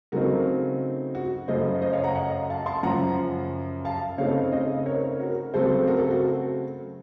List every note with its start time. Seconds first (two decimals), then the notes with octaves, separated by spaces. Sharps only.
0.12 C#3 F#3 A3 C4 D#4 F#4 A#4
1.15 F#4
1.48 F#2 C#3 A3 C5 D#5
1.81 C5 D#5
1.93 C#5 F5
2.04 F#5 A#5
2.15 D#5 F#5
2.50 F5 A5
2.66 A5 C6
2.83 F#2 C#3 F3 F#5 A#5
3.85 F5 A5
4.18 C#3 A3 C4 D#4 C#5 F5
4.52 C5 D#5
4.86 A#4 C#5
5.19 F#4 A#4
5.54 C#3 F#3 A3 C4 A4 C5
5.88 F#4 A#4
5.98 A4
6.11 F#4